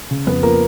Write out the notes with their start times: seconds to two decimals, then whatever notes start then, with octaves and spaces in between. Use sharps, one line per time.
0.11 C#3
0.27 F2 B3 B4
0.43 F3 A#3 A#4